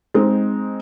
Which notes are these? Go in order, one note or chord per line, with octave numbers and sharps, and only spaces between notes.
G#3 C4 D#4